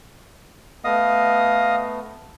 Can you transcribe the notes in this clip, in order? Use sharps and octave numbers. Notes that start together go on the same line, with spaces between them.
A3 B3 D#5 F5 D#6